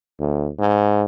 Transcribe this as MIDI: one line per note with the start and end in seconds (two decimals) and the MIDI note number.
0.20 0.49 38
0.59 1.05 44